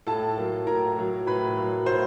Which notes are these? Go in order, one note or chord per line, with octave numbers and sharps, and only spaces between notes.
A2 A4 A5
F#3 A#3
A2 A#4 A#5
F#3 A#3
A2 B4 B5
F#3 A#3
A2 C5 C6